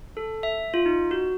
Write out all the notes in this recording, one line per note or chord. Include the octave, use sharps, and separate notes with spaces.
A4
E5
F4
D#4
F#4